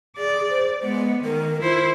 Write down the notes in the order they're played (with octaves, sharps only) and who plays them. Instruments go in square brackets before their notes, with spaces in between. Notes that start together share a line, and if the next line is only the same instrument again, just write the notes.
[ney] G#4 [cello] D5
[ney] C5
[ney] G#3 [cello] B3
[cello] D#3 [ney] A#4
[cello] E4 C5 [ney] F4